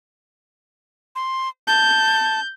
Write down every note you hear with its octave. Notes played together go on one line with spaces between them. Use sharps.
C6
A5 G6